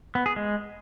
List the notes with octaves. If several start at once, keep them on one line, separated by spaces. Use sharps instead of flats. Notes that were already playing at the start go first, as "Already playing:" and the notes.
B3
G#4
G#3